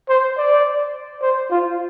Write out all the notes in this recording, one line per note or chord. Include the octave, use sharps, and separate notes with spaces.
C5
D5
C5
F4